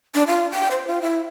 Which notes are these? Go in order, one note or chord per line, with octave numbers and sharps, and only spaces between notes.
D4
F4
G5
C5
F4
E4